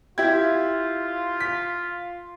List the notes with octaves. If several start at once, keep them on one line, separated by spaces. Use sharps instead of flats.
E4 F4 G4 G#6
B6